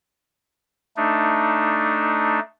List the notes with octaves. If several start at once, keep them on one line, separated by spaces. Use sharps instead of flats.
A3 D4 D#4